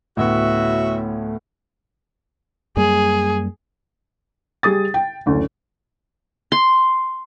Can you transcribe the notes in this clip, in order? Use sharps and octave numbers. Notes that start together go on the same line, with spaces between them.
D2 A2 B3 F#4 E5
F#2 G3 A#3 G#4
G3 G#4 D#6 A6
G5
F#1 D2
C6